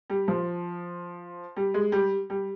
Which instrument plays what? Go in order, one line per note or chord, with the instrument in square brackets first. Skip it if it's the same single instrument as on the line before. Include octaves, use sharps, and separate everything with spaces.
[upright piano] G3
F3
G3
G#3
G3
G3